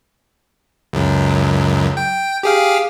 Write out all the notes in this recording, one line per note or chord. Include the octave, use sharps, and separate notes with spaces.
C#2 F#2
G5
G4 G#4 F5